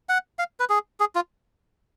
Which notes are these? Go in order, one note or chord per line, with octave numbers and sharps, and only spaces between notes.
F#5
F5
B4
G#4
G#4
F4